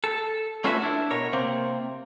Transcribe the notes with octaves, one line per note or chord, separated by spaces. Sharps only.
A4
A3 C#4 F4 F#4 B4 E5
D4 E4
B2 A#4 C#5
C3 A#3 C4